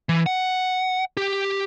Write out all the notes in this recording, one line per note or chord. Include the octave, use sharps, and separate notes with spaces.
E3
F#5
G4